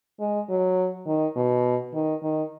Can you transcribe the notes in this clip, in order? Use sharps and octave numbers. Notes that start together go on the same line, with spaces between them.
G#3
F#3
D#3
B2
D#3
D#3